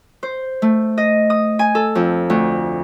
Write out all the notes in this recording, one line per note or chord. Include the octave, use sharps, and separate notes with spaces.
C5
A3
D#5
D#6
G#5
A4
F2
D2